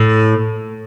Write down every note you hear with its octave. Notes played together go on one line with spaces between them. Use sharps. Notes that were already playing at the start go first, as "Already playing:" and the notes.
Already playing: A2